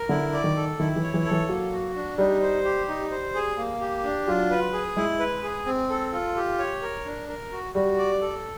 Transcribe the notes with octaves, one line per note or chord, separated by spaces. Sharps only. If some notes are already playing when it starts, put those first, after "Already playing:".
Already playing: A#4
D3 E4
D5
D#3
A4
D#3 E4
E3
C#5
E3
A4
E3
F#3 A#3
F#4
D4
G3 D#4
C5
G4
D#4
C5
G#4
A#3
G4
D4
F#3 F4
B4
G#4
G#3 E4
B4
G#4
C4
A4
F4
G4
C#5
A#4
D4
A#4
F#4
G3 F#4
D5
A4